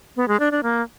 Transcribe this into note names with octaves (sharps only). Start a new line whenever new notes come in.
B3
G#3
D4
D4
A#3